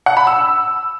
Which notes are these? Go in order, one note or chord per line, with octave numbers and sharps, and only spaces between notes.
F#5
B5
E6